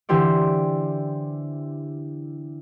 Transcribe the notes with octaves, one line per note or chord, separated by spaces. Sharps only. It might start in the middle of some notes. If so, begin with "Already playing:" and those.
D3 E3 E4 G4 C5 D5